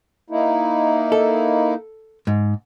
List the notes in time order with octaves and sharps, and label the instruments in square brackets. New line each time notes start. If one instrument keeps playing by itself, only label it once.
[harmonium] A#3 D#4 E4
[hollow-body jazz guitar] A4
G#2